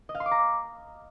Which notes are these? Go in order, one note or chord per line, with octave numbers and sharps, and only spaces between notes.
D#5
F5
C6
D6
A#5